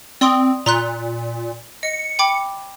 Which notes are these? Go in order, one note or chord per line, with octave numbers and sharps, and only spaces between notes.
C4 D5 C6 D#6
A#2 A#5 C6 F#6
D#5 C#7
G5 B5 D6